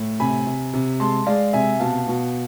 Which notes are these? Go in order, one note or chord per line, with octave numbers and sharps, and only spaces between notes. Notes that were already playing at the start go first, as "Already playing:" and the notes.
Already playing: A2
C3 G#5 B5
C3
C3
G#3 A5 C6
G#3 D5 F5
C3 E5 G#5
B2 F5 A5
B2